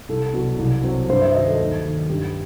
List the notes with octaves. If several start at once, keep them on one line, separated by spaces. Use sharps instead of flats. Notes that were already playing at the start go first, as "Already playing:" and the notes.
C2 A4
B2 F#3
C2
C3 F#3
G2 C5
E5
D#3 F#3 D#5
A4
D#2 A4
D#3 F#3
G2 G4